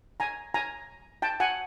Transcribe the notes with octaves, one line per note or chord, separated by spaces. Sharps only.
G#5 A#5
G#5 A#5
G5 A5
F#5 G#5